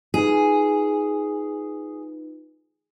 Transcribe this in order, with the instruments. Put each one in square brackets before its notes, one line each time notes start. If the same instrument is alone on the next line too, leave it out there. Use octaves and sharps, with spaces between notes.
[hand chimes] D#4 F4 B4 [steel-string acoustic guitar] G#4